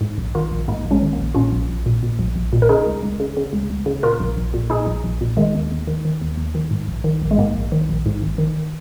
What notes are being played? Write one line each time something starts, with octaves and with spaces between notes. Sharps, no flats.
G#2
A#1
D#3 F4 A#4
A#1
G#2 A#3 D#4
A#1
G#3 C#4
D#3
A#3
A#1
A#2 C#4 F4
A#1
A#1
A#2
A#2
A#1
A#1
A#2
A#4
C#3 D#4 G#4
C#2
C#2
C#3
C#3
C#2
C#2
C#3
A#2 F4 A#4
A#1
A#1
A#2
A#2 D#4 G#4
A#1
A#1
A#2
D#3 G#3
D#2
D#2
D#3
D#3
D#2
D#2
D#3
G#2
A#1
D#3
A#1
G#3
G#2 A#3
A#1
D#3
A#1
G#2
G#1
D#3